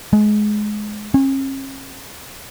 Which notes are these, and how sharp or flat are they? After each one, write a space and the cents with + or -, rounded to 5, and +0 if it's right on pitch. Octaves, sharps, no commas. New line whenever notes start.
G#3 +20
C#4 -45